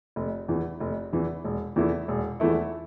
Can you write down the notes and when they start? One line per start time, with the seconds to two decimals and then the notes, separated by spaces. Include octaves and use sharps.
0.16 F1
0.48 E2 E3
0.80 F1
1.13 E2 E3
1.44 E1
1.76 E2 E3 A3 E4
2.08 E1
2.40 E2 E3 A3 E4